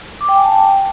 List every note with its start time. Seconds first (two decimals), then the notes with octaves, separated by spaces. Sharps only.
0.21 D6
0.29 G5
0.36 G#5
0.44 A5
0.52 G5